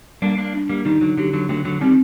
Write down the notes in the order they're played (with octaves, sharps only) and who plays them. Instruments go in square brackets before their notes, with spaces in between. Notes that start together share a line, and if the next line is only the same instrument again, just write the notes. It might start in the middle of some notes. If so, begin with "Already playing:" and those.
[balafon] G3 [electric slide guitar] A#3 D4
[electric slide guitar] A#3 D4
[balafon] D4
[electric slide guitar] G3 A#3
[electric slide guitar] D#3 G3 [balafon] D#4
[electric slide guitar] D3 F#3
[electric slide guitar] D3 F#3 [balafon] G4
[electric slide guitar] D3 F#3
[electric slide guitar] D3 F#3 [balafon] A3
[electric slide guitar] D3 F#3
[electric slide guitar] D#3 G3 [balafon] C4